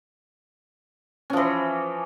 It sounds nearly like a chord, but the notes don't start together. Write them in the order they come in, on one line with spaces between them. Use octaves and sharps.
C#4 F3 E3